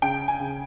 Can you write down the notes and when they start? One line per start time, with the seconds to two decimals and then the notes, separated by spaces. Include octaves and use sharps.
0.02 C#3 G5
0.28 G#5
0.40 C#3